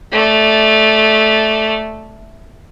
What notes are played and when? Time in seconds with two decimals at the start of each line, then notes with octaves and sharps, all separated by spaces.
0.12 A3 D5